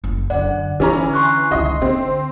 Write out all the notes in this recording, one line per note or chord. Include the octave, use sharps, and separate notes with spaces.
F#1
F#2 D3 D5 F#5
D3 E3 C#4 A#5
C6 C#6 F#6
C#2 D#3 E4 D#5 C6
D3 C4